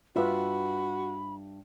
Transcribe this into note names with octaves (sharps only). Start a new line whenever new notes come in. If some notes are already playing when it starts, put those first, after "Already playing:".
G2 F4 F#4 B4 E5 B5